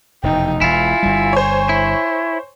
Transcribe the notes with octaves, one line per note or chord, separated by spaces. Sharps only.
F1 E2 B2 D#4 G5
E1 E4 F4 G#5
G1 G3
C5 C#5
E4